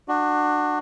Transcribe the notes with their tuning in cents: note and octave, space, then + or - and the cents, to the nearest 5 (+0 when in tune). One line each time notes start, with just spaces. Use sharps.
D4 +25 F#4 +0